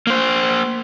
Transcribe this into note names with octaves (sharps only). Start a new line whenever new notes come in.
A#3 C5